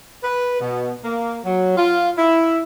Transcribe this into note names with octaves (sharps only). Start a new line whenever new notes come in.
B4
B2
A#3
F#3
F4
E4